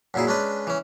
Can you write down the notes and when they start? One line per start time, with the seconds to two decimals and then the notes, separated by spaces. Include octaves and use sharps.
0.14 F#2 A#2 E4 G#4
0.27 G#3 C#4 D4 B4
0.67 E3 C#4